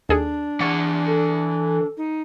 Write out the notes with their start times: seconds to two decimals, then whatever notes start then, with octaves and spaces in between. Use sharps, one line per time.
0.09 D#2 D4 G#4 A4
0.60 E3 F#5 C#6 A6
1.06 A4
1.97 D#4